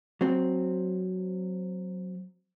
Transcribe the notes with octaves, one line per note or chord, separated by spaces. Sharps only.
F#3 C4